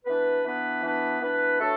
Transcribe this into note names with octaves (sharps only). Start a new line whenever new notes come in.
E3 B3 D4 B4
E3 B3 D4 B4
E3 B3 D4 B4
E3 B3 D4 B4
A2 A3 D4 F#4 A4